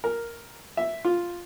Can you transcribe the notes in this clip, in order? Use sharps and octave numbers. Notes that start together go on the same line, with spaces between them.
A#4
E5
F4